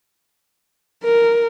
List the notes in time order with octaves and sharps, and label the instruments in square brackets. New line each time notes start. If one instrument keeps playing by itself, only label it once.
[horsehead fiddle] A#4